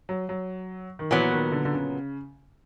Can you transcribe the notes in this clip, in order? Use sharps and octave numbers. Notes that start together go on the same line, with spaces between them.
F#3
F#3
D#3
A#2 E3 F#3 B3
D#3
D3
D3
C#3